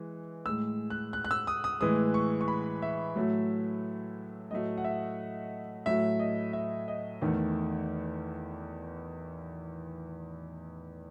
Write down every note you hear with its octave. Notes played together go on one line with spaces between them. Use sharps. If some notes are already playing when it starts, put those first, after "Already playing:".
Already playing: E3 G#3
A2 G#3 E6
F#6
F#6
F#6
E6
D#6
D#6
A2 E3 G#3 D#6
C#6
C#6
B5
E5
A2 F#3 A3
A2 F#3 A3 D#5
F#5
E5
A2 F#3 A3 E5
D#5
E5
D#5
E2 D#3 A3